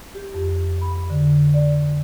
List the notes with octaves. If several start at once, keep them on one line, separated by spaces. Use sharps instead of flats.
G4
F2
B5
D3
D5